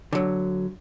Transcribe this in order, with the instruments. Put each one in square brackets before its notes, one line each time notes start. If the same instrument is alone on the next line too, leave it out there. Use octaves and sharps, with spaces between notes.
[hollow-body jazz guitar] D3 F#3